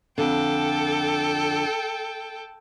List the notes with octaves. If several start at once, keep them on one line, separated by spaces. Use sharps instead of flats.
F2 D3 A4 G5